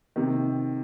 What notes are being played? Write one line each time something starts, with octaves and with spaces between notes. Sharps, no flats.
C3 D#3